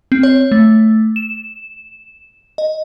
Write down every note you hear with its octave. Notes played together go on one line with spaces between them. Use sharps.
C4
C#5
A3
E7
D#5